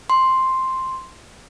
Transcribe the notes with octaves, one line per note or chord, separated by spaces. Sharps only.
C6